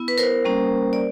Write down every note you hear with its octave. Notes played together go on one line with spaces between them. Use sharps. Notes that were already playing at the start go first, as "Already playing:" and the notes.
Already playing: B3 E4
B4
A#4 C5
G3 A#3 C#4
D5